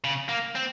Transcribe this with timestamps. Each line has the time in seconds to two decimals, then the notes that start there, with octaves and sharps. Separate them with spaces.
0.04 C#3
0.29 A#3
0.56 C4